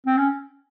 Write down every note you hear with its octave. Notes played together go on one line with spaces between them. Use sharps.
C4
C#4